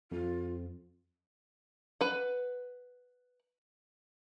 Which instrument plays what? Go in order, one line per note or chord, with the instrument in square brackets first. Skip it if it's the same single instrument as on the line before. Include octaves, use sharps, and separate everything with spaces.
[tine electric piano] F2 [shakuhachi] F4
[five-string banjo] B4 F#5